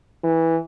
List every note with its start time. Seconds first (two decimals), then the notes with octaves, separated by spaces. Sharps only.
0.24 E3